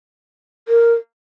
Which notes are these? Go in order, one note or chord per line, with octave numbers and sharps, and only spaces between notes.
A#4